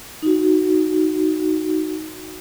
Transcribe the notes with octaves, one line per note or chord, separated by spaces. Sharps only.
D#4 F#4